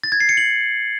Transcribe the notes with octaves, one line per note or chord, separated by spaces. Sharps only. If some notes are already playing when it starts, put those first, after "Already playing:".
A6
G#6
C7
C#7
F#7